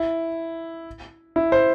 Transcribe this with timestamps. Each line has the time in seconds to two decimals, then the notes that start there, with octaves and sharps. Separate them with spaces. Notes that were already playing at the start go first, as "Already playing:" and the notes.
Already playing: E4
1.36 E4
1.52 C5